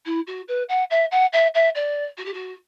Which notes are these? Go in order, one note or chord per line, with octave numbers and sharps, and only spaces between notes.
E4
F#4
B4
F#5
E5
F#5
E5
E5
D5
F#4
G4
F#4